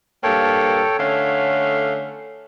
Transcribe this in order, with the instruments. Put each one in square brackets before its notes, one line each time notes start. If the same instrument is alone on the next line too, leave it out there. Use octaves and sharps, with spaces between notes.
[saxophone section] G2 A#3 [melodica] A4 C#5 G5
[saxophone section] D3 A3 C#4 [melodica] F5